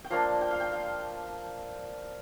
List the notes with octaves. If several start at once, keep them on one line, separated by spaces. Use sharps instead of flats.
G5
F3 A#3 D4 F5
G5
F5
G5
F5